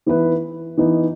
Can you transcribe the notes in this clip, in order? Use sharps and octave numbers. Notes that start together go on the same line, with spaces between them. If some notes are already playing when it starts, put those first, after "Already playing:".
E3 B3 E4 B4
E3 B3 D#4